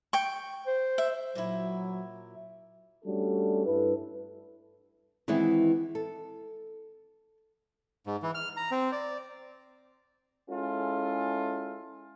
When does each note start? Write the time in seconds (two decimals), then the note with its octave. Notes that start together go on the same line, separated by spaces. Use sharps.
0.13 G5 C#6
0.67 C5
0.98 E5
1.35 A#2 F#3 E4
3.05 G3 A3 C#4 D4 F#4 A4
3.65 G2 E4 A4 B4
5.28 D#3 E3 G#3 B3 C4 E4
5.95 A4
8.07 G#2
8.22 E3
8.35 F6
8.57 A#5
8.71 C4
8.92 D5
10.49 G#3 C#4 E4 F4 G#4 A4